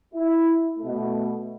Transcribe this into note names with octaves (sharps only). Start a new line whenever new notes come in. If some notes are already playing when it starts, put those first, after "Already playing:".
E4
B2 A3